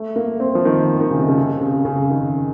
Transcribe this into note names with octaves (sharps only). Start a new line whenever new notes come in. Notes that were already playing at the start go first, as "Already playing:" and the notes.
Already playing: A3
A#3
C4
F3
D#3
D#3
C#3
C3
C#3
C3
C#3
C#3
D#3